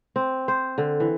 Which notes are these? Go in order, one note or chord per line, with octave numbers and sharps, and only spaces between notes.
C4
C5
D3
E3